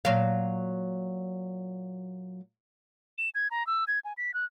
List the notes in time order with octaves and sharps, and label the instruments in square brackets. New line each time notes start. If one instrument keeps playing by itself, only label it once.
[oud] A#2 F#3 F5
[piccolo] E7
G#6
A#5
E6
G#6
G#5
B6
F#6